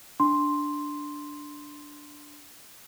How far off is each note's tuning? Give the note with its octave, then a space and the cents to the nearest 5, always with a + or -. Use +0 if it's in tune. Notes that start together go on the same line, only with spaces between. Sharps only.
D4 +0 C6 +0